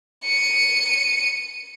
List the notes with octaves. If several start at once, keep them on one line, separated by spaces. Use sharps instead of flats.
C#7 D#7